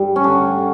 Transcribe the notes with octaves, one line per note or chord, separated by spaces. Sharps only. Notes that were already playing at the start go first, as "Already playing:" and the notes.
Already playing: G2 G3
C#4
D3 D4
D3